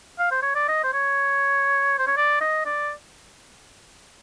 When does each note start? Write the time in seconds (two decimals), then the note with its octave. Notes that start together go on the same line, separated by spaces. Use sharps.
0.19 F5
0.31 C5
0.43 C#5
0.56 D5
0.69 D#5
0.83 C5
0.93 C#5
1.99 C5
2.07 C#5
2.17 D5
2.41 D#5
2.66 D5